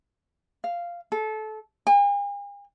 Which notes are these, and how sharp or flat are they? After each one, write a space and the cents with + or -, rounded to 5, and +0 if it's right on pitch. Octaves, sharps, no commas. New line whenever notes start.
F5 -5
A4 -25
G#5 -45